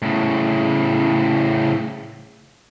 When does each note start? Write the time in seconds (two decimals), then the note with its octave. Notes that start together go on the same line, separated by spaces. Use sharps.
0.02 A2 C#3